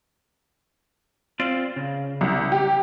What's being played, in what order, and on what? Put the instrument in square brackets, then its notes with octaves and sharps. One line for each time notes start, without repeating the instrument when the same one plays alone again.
[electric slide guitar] C4 F4 D5
C#3
[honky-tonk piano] C2
G4